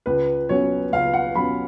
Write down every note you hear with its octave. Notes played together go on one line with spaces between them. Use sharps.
C#2 B4
B2 F#3 C#4 C#5
C#2 F5
F#5
B2 F#3 C#4 B5